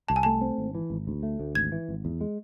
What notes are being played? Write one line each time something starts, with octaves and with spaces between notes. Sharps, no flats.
C2 A5
G#5
A3 A5
C4
G#1
E3
G#1
D2
A3
D2
G#1 G#6
E3
G#1
E2
G#3